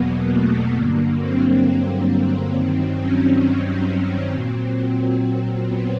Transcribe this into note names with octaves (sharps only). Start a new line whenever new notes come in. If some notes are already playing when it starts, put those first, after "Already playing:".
Already playing: E2 B2 F#3 A#3 B3
A3
G2 D3 F#3 A#3
C4
G2 D#3 F#3
C#4
A#2 F#3 C4
B3